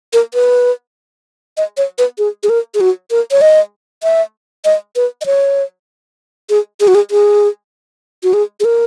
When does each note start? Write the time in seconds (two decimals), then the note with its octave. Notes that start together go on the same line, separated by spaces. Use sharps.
0.13 A#4
0.34 B4
1.57 D#5
1.77 C#5
1.98 B4
2.18 G#4
2.43 G#4
2.49 A#4
2.74 G#4
2.81 F#4
3.11 A#4
3.31 C#5
3.41 D#5
4.03 E5
4.65 D#5
4.96 B4
5.21 D#5
5.26 C#5
6.50 G#4
6.80 G#4
6.88 F#4
6.95 G#4
7.11 G#4
8.23 F#4
8.33 G#4
8.60 G#4
8.65 A#4